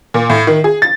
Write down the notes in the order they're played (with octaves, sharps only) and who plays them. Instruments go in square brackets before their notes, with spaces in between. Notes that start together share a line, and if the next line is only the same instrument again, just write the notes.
[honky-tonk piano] A#2
A2
D#3
G#4
A6